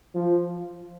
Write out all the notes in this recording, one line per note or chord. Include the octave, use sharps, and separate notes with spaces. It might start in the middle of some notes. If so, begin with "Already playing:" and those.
F3